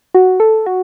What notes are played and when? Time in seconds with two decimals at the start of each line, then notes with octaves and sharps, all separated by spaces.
0.14 F#4
0.40 A4
0.66 F#4